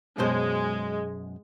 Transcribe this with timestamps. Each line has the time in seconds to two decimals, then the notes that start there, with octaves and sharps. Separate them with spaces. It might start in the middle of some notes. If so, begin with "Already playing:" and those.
0.18 F#2 B2 G#3 C5